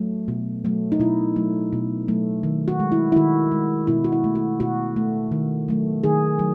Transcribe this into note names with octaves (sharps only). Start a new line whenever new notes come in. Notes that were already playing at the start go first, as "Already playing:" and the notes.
Already playing: F#3 A3
B2
F#3 A3
D#4
B2 E4
F#3 A3
B2
F#3 A3
D#3
F#4
G#3
E4
E4
D#3 F#4
G#3
B2 E4
F#4
E4
A3
F#4
B2 F#4
A3
D#3
F#3 A3
D#3 G#4
F#3